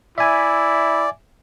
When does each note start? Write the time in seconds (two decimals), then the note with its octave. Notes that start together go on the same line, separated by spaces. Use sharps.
0.18 E4 D5 E5 G#5